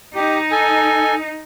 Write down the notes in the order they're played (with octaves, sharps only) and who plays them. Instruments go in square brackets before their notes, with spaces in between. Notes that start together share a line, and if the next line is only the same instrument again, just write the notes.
[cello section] D#4 [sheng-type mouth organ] G4
[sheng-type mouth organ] A4 G#5